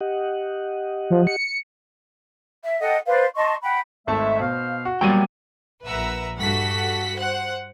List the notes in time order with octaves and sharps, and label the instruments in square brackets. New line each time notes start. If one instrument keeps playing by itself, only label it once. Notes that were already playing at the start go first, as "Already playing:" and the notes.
[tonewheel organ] G4 D#5 F#5
[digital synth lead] F3
C#7
[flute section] E5
A4 D#5 F#5 G5
B4 C5 D5 F5
D#5 A5 C6 C#6
F#5 G5 B5
[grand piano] G#1 A3 A5 [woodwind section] G#3 E5
[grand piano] B2 [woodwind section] C5 F5
[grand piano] F#4
[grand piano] F#3 D#7 [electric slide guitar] G3 A#3 G5 [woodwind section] B3 G4
[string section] A#1 B4 E5 F#5 A#5 E6
G2 F#4 A4 F#5 B6
C5 F#5 F#6